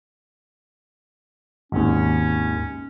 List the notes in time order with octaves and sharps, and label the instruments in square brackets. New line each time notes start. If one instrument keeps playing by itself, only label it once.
[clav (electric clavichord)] G#1 D#2 [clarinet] C#4